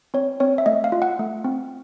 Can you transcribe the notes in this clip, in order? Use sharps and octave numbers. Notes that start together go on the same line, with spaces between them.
C4 C#5
C4 C#5
E5
A3 D#5
F5
F4
F#5
A3
C4